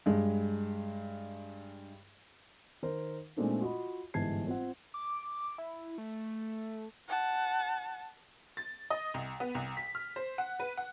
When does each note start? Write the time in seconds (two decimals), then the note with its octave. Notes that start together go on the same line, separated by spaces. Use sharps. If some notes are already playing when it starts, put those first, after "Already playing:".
0.06 G2 G#3
2.82 D#3 A#4 C5
3.37 A#2 G#3 A3 C4 D4 D#4
3.61 F4 F#4 D#5 B5
4.14 G1 G#2 E3 A5 G#6 C7
4.47 C4 F4 F#5
4.94 D6
5.58 E4
5.98 A3
7.08 F#5 A5
8.57 A6
8.90 D#5
9.14 C2
9.40 B3
9.55 C2
9.77 B6
9.95 F6
10.16 C5
10.38 F#5
10.60 B4
10.77 F#5